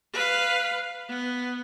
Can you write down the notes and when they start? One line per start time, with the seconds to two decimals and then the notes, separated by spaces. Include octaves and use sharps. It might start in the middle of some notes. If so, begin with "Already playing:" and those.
0.13 B4 F5
1.09 B3